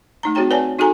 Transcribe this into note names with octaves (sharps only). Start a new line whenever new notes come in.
A3 D#4 A#5
C4 F#4 G#4 C#5 G5 A#5
B4 C#5 D5 G#5 A5
D#4 F#4 G#4 A4 G#5 A#5